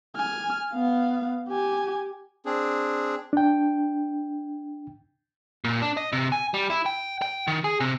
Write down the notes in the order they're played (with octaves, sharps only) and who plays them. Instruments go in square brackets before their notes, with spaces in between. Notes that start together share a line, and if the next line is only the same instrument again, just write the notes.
[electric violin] G#5 F6
B3 F5
G4 G#5
[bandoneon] C4 D4 G#4
[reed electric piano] D4 G5
[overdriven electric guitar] A#2
D4
D#5
C3
G#5
G3
E4
G5
G5
D#3
G#4
C3